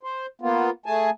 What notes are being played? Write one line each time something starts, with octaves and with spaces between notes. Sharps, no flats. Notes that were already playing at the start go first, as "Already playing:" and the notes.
C5
A#3 B3 F4
A3 G#4 G#5 A5